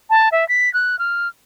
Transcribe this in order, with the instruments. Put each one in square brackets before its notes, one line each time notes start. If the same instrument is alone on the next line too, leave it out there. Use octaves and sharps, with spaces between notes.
[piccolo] A5
E5
B6
F#6
F6